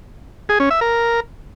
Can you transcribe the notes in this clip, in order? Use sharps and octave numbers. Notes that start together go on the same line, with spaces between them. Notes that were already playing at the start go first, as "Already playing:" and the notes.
G#4
C#4
E5
A#4